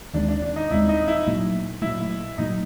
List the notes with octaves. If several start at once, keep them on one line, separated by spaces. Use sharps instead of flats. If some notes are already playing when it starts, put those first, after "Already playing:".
D#2 D#3 G#3 C4 D4
D4
D4
D#4
D#2 D#3 G#3 C4 E4
D#4
E4
A#2 F#3 A3
A#2 F#3 A3 E4
A#2 F#3 A3 D#4